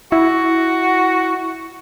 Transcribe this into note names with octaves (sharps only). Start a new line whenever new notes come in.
E4 F#4